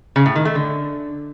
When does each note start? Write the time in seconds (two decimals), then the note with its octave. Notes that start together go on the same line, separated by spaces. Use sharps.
0.16 C#3
0.26 A2
0.35 D#3
0.45 A3
0.55 D3